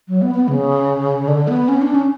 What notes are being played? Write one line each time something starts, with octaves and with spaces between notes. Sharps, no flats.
F#3
B3
B3
C#3
D3
B3
C#4
D4
C#4